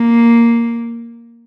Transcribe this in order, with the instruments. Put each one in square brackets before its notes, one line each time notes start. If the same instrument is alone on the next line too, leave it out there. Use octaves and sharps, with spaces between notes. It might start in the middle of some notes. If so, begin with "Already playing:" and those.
Already playing: [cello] A#3